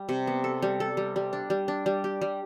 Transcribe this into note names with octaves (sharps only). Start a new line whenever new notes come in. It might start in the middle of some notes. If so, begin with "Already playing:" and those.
Already playing: G3
C3
B3
A4
G3
A4
G3
G3
D4
G3
D4
G3
G4
G3